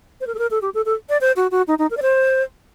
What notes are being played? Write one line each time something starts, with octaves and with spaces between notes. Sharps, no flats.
C5
A#4
A4
A#4
A4
G4
A4
A4
D5
C5
F#4
F#4
D#4
D#4
A#4
D5
C5